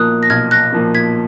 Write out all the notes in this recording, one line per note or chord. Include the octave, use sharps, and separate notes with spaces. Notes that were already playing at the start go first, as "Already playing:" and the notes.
Already playing: B1 A#2 F3 A#3 D#6 F#6
A#6
B1 F6 G#6
F#6 A#6
A#2 F3 A#3
G#6 B6